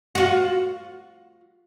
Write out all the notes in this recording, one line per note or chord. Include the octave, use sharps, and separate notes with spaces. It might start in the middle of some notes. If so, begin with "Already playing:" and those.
F4 F#4